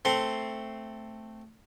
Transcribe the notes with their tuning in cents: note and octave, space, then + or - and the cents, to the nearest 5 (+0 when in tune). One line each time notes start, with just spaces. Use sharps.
A3 +5 C4 +0 C6 +0